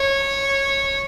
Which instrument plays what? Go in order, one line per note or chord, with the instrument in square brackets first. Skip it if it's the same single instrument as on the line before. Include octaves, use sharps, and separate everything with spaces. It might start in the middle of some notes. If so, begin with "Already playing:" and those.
Already playing: [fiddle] C#5